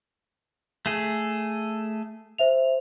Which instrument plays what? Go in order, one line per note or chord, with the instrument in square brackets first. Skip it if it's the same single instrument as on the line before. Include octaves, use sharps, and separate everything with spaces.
[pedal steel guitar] A3 G#4
[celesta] C5 E5 F7